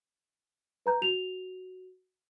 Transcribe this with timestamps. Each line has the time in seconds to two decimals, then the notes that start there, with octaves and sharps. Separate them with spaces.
0.86 B4 A#5 G6
1.02 F#4 F7